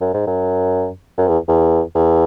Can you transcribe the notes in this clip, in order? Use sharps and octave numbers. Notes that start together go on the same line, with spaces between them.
F#2
G#2
F#2
F#2
E2
E2
E2